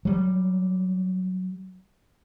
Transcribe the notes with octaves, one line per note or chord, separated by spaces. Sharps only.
F#3 G3